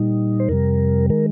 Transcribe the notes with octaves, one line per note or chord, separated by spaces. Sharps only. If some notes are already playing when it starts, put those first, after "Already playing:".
Already playing: A#2 G3 D#4
C5
F2 C3 G3 A#4
D#3 G#3 A#4